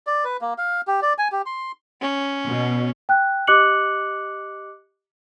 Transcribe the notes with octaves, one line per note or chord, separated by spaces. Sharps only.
D5
B4
A#3
F5
G4
D5
G#5
G4
C6
C#4
B2
G5 F#6
G4 D#5 D6 F#6 C#7 F#7